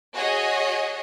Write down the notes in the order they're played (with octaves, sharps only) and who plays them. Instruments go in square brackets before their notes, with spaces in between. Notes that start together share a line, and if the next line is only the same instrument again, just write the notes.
[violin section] F#4 G#4 C#5 D#5